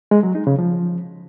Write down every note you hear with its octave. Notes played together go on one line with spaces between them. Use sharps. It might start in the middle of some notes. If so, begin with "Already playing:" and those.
G#3
F#3
D#4
C#3
F3